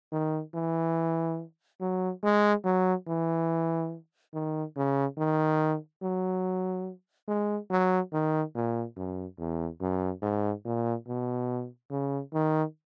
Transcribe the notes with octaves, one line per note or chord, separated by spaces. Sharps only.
D#3
E3
F#3
G#3
F#3
E3
D#3
C#3
D#3
F#3
G#3
F#3
D#3
A#2
F#2
E2
F#2
G#2
A#2
B2
C#3
D#3